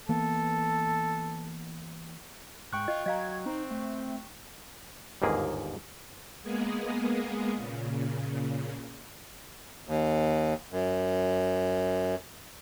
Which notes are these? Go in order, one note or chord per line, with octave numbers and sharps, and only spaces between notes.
E3 A#3 B3 A4
G#2 G5 C#6 F#6
F4 D#5
F#3 D#5 F5 A#5 G#6
C4 D#4
A3
G1 D#2 G#2 A#3 G#4
G#3 A#3 B3 G#4
A#2 C#3
D#2
F#2